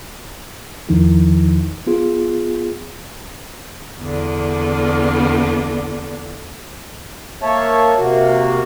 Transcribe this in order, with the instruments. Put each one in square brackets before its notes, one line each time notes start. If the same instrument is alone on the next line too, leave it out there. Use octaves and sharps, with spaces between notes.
[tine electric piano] E2 D#3 F3 D#4 E4
B3 F4 G#4
[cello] E2 D3
[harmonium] A#3 C#5 E5 A5
C3 A#3 F#4